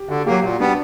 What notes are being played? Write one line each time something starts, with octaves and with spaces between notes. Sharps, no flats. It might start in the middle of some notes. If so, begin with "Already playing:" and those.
Already playing: G4
D3 F#4
F#3 A#3 G4
A#2 F#4
G3 B3 D4